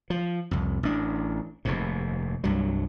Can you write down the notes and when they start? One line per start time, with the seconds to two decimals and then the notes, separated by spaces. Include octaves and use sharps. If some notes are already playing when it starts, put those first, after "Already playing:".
0.10 F3
0.51 C2 F2
0.83 A1 D4
1.65 F1 D#2 G#2
2.44 C2 G2 F#3